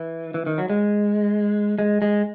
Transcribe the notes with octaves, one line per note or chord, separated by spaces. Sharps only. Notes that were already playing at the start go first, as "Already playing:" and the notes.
Already playing: E3
E3
D#3
F#3
G#3
G#3
G#3